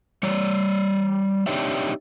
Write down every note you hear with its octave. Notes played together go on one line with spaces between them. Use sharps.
G3 C#5 D5
C4 D4 D#4 G4 C#5 E5